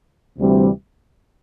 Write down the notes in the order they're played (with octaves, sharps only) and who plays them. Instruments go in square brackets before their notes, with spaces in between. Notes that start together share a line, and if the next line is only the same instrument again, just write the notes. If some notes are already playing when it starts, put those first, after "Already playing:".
[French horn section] D2 C3 E3 G3 C4